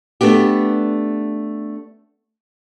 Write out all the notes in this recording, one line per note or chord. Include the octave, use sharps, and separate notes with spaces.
A3 B3 D4 G4